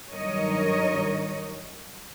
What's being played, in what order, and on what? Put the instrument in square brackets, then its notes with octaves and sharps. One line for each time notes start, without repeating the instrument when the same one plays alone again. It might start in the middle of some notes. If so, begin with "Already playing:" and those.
[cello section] G2 D#3 F#3 A#4 C#5 D#5